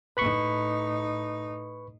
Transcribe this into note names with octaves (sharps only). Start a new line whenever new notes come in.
A2 D#4 B4 B5 C#6